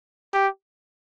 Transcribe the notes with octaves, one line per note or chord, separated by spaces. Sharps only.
G4